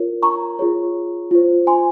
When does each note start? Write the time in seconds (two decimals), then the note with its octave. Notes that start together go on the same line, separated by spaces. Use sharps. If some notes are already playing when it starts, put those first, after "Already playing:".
Already playing: F4 A#4 C#5
0.23 A#5 C#6
0.59 F4 G#4 C#5
1.31 F4 C5
1.67 G#5 C6